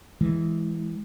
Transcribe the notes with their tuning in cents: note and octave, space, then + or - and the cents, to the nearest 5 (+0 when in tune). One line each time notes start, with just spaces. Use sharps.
E3 +0 G#3 +0